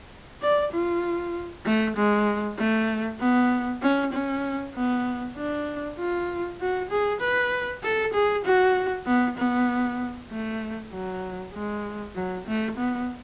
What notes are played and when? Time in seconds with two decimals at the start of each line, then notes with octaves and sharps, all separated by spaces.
0.42 D5
0.72 F4
1.66 A3
1.97 G#3
2.59 A3
3.20 B3
3.82 C#4
4.13 C#4
4.75 B3
5.37 D4
5.99 F4
6.60 F#4
6.91 G#4
7.21 B4
7.83 A4
8.14 G#4
8.45 F#4
9.06 B3
9.38 B3
10.30 A3
10.92 F#3
11.53 G#3
12.15 F#3
12.47 A3
12.77 B3